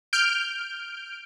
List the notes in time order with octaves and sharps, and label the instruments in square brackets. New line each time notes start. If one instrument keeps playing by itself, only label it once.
[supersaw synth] F6 G6 D7